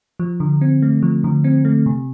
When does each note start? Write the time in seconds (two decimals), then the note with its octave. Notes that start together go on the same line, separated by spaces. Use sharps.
0.20 F3
0.40 D3
0.61 C4
0.82 A3
1.03 F3
1.24 D3
1.44 C4
1.65 A3
1.86 C3